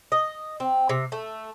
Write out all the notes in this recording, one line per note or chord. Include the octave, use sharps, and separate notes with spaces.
D#5
C4
C3
A3